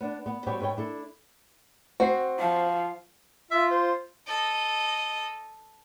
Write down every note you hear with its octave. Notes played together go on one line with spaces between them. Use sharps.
B3 D4
B3
G3 B3 C4 F#4 B4 C#5
G#2 B4 C#5 G5
D4 E4 A4
C4 F#4 C7
F3 F5
F4 E5
C5
A4 D#5